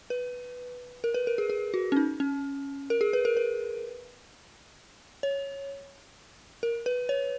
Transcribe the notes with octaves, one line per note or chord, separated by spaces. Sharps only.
B4
A#4
B4
A#4
G#4
G#4
F#4
C#4
D#4
C#4
A#4
G#4
B4
A#4
B4
C#5
A#4
B4
C#5